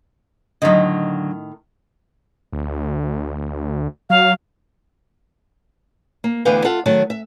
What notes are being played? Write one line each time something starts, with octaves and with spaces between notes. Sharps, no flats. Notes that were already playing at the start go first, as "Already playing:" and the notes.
A2 D3 D#3 F#3 D#5
D2
F#3 F5
A#3
D2 D3 E3 B3 F5 G5
F4 A4 E5 F#5
D#3 F#3 A3 A5
E5